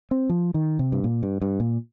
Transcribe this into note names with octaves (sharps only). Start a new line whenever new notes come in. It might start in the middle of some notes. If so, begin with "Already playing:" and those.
C4
F3
D#3
C3
G2
A#2
G2
G2
A#2